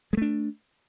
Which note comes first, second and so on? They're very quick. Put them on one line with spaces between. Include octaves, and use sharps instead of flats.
G#3 A3 D4